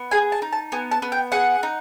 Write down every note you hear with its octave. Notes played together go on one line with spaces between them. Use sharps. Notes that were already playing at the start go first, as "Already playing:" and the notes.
Already playing: B3
G#4 G#5
A5
D#4
A5
B3 G#5
A5
B3
G5
G#4 F#5
D#4